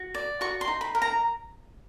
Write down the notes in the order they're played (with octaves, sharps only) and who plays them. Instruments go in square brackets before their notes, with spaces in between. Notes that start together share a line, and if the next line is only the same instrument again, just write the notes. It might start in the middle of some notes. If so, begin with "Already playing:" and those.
Already playing: [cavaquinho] F#4
D5
F#4 C#6
C6
D#4
B5
A#4
A#5